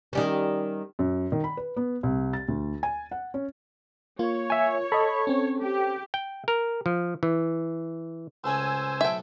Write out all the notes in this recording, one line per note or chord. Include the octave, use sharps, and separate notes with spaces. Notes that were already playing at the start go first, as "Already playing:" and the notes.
D#3 G3 C#4
F#2
D#3
B5
B4
B3
C2
A6
D2
G#5
F#5
C#4
A#3 F4 C#5
E5 G#5
A4 D#5 B5
C4 C#4
G4
G5
A#4
F3
E3
C#2 A2 C#4 C5 G#5 E6
B1 A2 A4 E5 G5